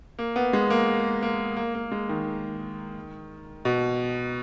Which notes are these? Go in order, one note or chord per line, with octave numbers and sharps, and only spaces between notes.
A#3
B3
G#3
A#3
A#3
A#3
A#3
G#3
D#3
B2